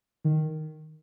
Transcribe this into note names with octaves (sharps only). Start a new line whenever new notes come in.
D#3